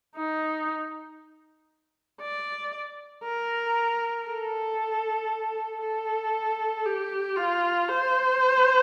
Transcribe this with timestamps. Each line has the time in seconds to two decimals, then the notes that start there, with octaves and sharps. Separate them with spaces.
0.16 D#4
2.22 D5
3.25 A#4
4.27 A4
5.82 A4
6.85 G4
7.36 F4
7.88 C5